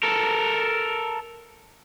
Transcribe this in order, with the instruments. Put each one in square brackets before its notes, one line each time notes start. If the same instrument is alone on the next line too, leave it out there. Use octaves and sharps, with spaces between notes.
[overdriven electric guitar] A4 A#4